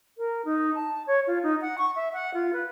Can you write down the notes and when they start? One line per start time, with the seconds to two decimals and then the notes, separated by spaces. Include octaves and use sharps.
0.18 A#4
0.45 D#4
0.75 A5
1.07 C#5
1.27 F4
1.43 D#4
1.61 F#5
1.78 C#6
1.96 E5
2.13 F#5
2.34 F4
2.53 B4